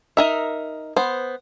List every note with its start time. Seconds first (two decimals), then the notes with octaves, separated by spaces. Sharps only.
0.17 D#4 A#4 E5
0.96 B3 C5